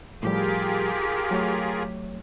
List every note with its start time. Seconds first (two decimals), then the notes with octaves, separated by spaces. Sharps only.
0.23 A2 F3 G3 F4 G4 G#4 A#4
1.31 F#3 A3 C#5